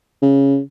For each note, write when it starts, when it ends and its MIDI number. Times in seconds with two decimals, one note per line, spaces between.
0.22 0.60 49